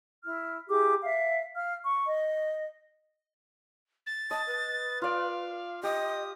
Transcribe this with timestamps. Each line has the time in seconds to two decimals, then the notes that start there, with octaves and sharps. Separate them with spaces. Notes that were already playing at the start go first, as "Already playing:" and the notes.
0.23 E4 F6
0.69 E4 G4 G#4 D6
1.03 E5 F5
1.55 F5 F6
1.84 C#6
2.06 D#5
4.06 A6
4.31 D#5 A5
4.47 B4
5.02 F4 D5 F5
5.83 G4 D#5 D#6